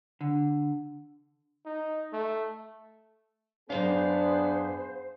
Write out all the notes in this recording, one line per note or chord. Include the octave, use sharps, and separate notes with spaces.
D3
D#4
A3
F#2 D#3 B3 D4 G#4 C5 F5